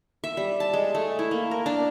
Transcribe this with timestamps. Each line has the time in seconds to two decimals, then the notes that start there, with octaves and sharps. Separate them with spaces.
0.24 E5
0.37 G3
0.60 A5
0.73 G#3
0.95 A3
1.19 E4
1.31 A#3
1.51 A#4
1.66 D4